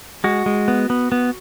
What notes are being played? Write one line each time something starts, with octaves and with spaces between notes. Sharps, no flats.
G#3 F#4
G#3
B3
B3
B3